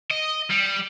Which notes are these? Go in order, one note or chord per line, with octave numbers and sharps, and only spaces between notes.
D#5
G3